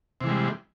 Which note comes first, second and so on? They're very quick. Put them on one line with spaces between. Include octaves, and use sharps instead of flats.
C3 E3 G#3 G3